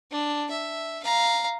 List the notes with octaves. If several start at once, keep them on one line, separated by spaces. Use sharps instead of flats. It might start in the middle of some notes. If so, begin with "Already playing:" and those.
D4
E5
F5 A#5